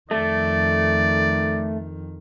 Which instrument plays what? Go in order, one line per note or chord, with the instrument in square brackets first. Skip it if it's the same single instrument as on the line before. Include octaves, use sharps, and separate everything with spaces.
[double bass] F2 D#3 [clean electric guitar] A3 [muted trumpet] D5